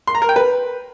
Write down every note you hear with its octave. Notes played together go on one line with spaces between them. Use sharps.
C6
A#5
A#4
G5
B4